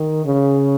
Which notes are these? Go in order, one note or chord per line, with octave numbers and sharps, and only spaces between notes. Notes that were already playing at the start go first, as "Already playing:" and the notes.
Already playing: D#3
C#3